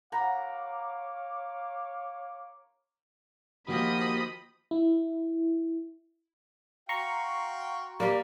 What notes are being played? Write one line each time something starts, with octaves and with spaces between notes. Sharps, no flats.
C#5 F5 F#5 A#5 B5 D6
D#3 F3 A#3 F#4 G4 D#5 B5 D#6
E4
F#4 F5 G5 A#5 C6 C#6
G3 A#3 D5